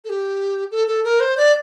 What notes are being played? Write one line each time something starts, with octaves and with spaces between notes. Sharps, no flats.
A4
G4
A4
A4
A#4
C5
D5